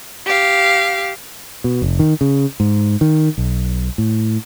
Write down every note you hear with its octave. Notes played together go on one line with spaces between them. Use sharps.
G4 F5
B2
F1
D#3
C#3
G#2
D#3
B1
A2